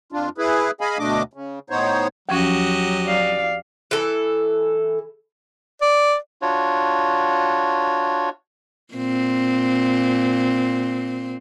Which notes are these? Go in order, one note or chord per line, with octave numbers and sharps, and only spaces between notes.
F2 D4 F4
E4 G#4 B4
G#4 D#5 F5 G#5 B5
D2 B2 A3 D4 D#5 D6
C#3
A2 B3 D#4 C5 C#5
D#2 F3 F#3 C#4 F#4 G4 D#5
D5 F5
E3 A4
D5
D4 F4 F#4 C#5
A#2 C4